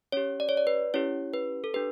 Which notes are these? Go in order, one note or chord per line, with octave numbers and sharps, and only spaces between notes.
C#4 G4 C#5
D5
C#5
D5
B4
C#4 E4 G4 C#5
B4
A4
D4 G4 B4